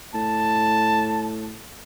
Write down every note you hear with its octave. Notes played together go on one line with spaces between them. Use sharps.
A2 A5